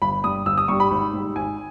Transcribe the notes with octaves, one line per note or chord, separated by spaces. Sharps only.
G1 B5
G2 G3 D#6
G1 E6
D#6
G2 G3 C#6
B5
G#1
G#2 G3
G#1 G#5